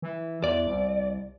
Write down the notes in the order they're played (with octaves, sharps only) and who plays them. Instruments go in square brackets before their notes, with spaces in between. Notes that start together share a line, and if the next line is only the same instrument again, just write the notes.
[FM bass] E3
[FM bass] E2 [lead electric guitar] D5
[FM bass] C2